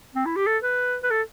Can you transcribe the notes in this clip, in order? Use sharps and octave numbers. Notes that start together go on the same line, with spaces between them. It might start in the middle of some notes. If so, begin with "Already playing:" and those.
C4
E4
G4
A4
B4
B4
A4